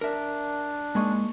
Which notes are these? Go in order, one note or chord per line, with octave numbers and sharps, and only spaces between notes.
D4 A#4 E5
G#2 G#3 A#3 D#5 C#6